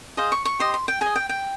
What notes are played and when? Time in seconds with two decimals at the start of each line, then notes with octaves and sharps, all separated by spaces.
0.17 G#4 C5 D#5 F5
0.32 C#6
0.45 C#6
0.59 G4 C5 D#5 C6
0.74 C6
0.88 G5
1.01 G#4 D#5 G#5
1.16 G5
1.29 G5